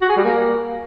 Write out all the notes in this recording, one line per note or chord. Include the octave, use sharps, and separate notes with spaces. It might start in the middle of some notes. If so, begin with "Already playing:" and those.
F#4
G#4
G3
A#3